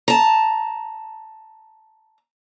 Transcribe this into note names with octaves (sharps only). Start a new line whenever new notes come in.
A5 A#5